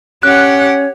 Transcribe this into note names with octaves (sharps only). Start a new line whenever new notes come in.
C#4 G4 C#5 F#5 F#6